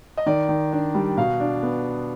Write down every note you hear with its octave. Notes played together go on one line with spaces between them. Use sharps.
D#5
D#3 D5
D#3
D4
G3
B2 F5
D4
B3